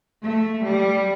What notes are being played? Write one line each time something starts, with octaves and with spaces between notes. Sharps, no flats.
A3
G3